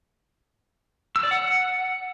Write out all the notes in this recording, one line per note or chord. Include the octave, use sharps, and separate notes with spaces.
E6
D5
F#5